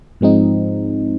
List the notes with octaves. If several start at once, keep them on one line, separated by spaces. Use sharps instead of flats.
G#2 F3 G#3 C4 D#4